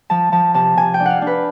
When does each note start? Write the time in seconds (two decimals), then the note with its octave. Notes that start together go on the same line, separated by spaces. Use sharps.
0.10 F3 A5
0.32 F3 A5
0.54 C3 A5
0.77 C3 G#5
0.94 G5
1.00 D4
1.06 F5 F#5
1.22 D4
1.27 B4